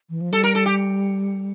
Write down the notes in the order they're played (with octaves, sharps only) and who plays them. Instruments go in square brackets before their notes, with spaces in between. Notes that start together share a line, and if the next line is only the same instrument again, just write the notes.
[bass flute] E3
F3
[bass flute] G3 [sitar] A4
[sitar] A#4
A4
G4